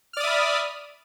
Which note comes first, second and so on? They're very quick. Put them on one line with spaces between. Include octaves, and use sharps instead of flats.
F6 D5 D#6 E5 B5